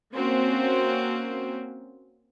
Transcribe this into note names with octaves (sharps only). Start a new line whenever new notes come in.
A#3 C4 C#4 F#4